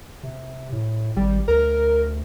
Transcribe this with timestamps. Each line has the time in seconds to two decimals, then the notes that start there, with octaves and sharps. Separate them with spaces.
0.23 C3
0.72 A2
1.16 G#1 G3
1.48 D2 A#4